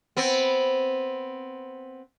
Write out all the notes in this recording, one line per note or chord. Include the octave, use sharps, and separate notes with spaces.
B3 C4